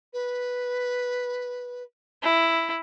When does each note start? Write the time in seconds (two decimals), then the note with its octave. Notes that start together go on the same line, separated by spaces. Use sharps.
0.13 B4
2.23 E4